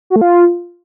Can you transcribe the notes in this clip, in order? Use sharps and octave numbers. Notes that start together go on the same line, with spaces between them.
F#4
A3
F4